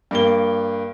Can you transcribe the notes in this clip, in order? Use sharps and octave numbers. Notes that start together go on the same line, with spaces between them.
G2 A#3 G7